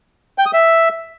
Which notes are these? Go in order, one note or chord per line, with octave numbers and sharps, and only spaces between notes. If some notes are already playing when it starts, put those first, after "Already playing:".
G5
D#6
E5